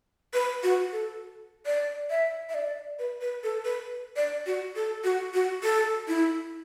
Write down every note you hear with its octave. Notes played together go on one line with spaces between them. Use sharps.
B4
F#4
A4
D5
E5
E5
D5
B4
B4
A4
B4
D5
F#4
A4
F#4
F#4
A4
E4